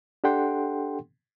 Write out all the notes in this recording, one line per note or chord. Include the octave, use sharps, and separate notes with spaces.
D4 G4 A4 F#5 G5 C6